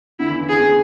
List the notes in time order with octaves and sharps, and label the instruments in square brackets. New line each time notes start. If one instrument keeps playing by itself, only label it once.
[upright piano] D3 [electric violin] E4
[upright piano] E3
C#3
[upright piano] D3 [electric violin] G#4
[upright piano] D3